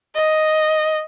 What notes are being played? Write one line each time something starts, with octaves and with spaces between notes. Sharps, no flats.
D#5